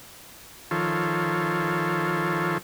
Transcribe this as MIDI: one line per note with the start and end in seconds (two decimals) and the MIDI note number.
0.71 2.58 51
0.71 2.58 53
0.71 2.58 65
0.71 2.58 69
0.71 2.58 73